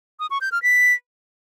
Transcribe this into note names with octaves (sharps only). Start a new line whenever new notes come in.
D#6
C#6
G6
F6
B6